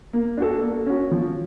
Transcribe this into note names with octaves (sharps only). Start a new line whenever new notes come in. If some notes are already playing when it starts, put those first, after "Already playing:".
A#3
D4 F#4 A4
A#3
C#4 F#4
F3